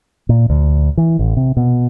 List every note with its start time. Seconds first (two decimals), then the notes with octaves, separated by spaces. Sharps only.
0.29 A#2
0.50 D2
0.97 E3
1.19 A1
1.37 C3
1.57 B2